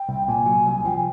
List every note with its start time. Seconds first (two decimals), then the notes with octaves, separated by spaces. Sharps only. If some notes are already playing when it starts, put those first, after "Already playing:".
Already playing: G5
0.09 C2
0.28 A#2 G#5
0.46 F#3
0.66 C2
0.85 F3 G5
0.97 G#5